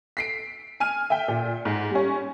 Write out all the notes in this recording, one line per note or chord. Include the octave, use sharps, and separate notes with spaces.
B6 C7 D7
G#5 F6 D#7
E5 G5
A#2
G#2
G3 C#4